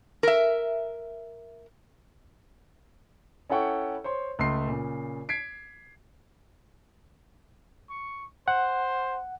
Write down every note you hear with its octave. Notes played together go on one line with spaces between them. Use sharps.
A#4 E5
C#4 E4 A4 F#5 G5 C#6
C5 C#5 C6
C#2 A3 C6 C7
A#2 C#3
G#6 B6 C7 D7
C#6
C5 F#5